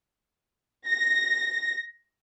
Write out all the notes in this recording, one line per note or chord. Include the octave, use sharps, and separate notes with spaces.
A#6